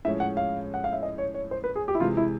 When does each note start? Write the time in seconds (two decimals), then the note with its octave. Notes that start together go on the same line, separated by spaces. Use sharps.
0.05 A2 F3 G#3 C#4 E5
0.20 F#5
0.37 F5
0.74 F#5
0.84 F5
0.93 E5
1.03 D#5
1.18 C#5
1.34 C#5
1.51 C5
1.64 B4
1.76 G#4
1.88 G4
1.95 E4
2.00 C3 E3 G#3 F4
2.17 E4